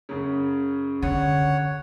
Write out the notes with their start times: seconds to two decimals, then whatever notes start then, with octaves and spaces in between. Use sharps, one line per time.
0.09 F#2 C#3
1.03 D3 C#5 F#5